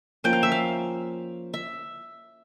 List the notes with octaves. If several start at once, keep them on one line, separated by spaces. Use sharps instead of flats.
F3 A#3 C#4 G5
F5
E5
F5
E5